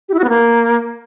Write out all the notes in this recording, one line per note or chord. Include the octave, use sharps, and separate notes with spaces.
G4
E4
F#4
B3
A#3